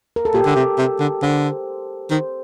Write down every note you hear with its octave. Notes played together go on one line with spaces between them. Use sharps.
A#4
A4
A#2 G4
D3
C3
C3
D3
D3 C5
D#3 C5